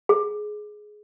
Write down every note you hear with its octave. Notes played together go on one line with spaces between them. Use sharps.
G#4